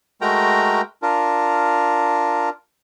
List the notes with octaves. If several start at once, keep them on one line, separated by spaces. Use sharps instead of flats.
G#3 A3 F#4 A#4 G5 A#5
D4 F4 A#4